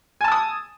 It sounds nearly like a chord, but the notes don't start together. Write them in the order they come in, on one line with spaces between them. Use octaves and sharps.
G#5 A5 E6 D#6